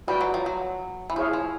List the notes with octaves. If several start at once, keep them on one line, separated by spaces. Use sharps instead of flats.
G3 F#4 B4 D5 G5
F#3
F3
F#3
E3
F3 E4 G#4 C#5 F5
F3